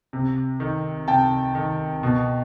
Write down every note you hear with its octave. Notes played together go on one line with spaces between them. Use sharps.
C3
D#3
C3 G5 A5
D#3
B2